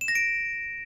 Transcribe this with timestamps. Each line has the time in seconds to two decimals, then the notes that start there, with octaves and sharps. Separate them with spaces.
0.01 E7
0.08 A#6
0.15 D7